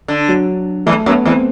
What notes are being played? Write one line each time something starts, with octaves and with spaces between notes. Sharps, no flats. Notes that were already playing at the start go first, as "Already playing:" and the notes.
D3
F#3
E2 E3 A3
F#2 F#3 B3
E2 E3 C4